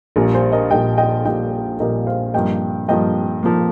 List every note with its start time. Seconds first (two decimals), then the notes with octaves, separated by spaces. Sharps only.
0.16 A#1 A#2 G3 A#4
0.34 C5
0.52 A#4 D#5
0.70 A#1 A#2 G3 D#5 G5
0.98 D#5 G5
1.25 A#1 A#2 G3 D#5 G5
1.80 A#1 A#2 G3 A#4 D#5
2.07 C5 F5
2.34 G2 F3 A#3 D#5 G5
2.88 G2 F3 A#3 D#5 G5
3.43 F3 A#3